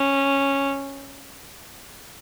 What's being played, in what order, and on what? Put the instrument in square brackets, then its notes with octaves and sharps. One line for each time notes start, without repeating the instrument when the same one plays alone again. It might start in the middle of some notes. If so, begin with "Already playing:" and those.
Already playing: [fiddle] C#4